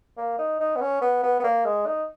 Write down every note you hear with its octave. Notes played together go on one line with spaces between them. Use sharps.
A#3
D#4
D#4
B3
C#4
B3
B3
B3
A#3
G#3
D#4